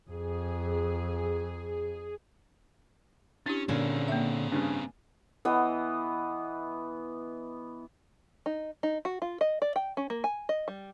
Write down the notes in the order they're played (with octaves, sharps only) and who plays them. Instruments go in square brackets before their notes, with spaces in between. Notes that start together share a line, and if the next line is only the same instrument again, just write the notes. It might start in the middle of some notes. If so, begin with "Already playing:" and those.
[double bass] F2 [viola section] G#4
[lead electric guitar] C#4 [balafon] D4 E4 G4
[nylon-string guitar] A#2 D3 C#4 [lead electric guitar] C4 G#4
[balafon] A#3 E5
[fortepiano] G2 C#3
[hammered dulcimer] E3 B3 D#5
[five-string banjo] D#4
D#4
F#4
F4
D#5
D5
G5
C#4
A#3
G#5
D#5
G3